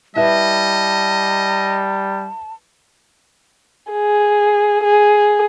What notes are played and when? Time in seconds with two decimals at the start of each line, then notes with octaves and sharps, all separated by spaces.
0.16 G3 E4 B4 D#5 E5 A5
3.92 G#4
4.84 G#4